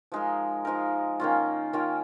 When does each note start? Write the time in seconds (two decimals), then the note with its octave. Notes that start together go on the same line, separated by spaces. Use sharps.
0.12 F3 G#3 D#4 A#4
0.65 F3 G#3 D#4 A#4
1.20 D#3 A#3 C#4 F4
1.73 D#3 A#3 C#4 F4